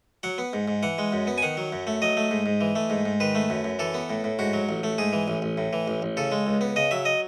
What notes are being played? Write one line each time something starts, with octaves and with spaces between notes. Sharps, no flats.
F#3 F#5
B3
G#2
G#2
E3 F#5
G#3
F#2
B3
G#5
D#3 F#5
F#3
F#2
A3
F#3 D#5
A3
G#2
G#2
E3
A3
G#2
G#2
D#3 B4
A3
F#2
F#2
E3 A4
B3
A2
A2
G#2 F#4
F#3
A1
A3
G#2 G#4
E3
A1
A1
A2
E3
A1
A1
C#3 A4
G#3
C#2
B3
C#3 D#5
F#3 E5
D#5